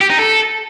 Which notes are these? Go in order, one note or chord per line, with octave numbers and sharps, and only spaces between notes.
G4
D#4
A4